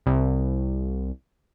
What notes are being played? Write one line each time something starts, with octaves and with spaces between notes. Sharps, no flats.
C2